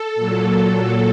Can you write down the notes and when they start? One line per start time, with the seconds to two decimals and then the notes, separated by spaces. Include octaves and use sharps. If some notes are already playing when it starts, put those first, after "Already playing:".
Already playing: A4
0.15 A#2 F#3